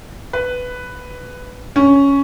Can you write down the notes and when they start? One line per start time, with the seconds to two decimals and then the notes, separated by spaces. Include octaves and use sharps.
0.33 B4
1.76 C#4